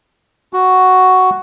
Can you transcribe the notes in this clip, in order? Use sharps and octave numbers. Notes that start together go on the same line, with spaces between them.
F#4